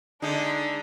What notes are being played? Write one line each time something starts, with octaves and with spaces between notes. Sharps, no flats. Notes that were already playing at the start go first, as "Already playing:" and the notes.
D3 G#3 D4 D#4